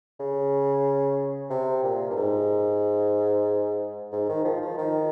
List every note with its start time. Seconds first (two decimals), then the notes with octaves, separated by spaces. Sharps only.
0.20 C#3
1.50 C3
1.83 A#2
2.10 G2
2.16 G#2
4.12 G#2
4.29 D#3
4.45 F3
4.61 F3
4.78 D#3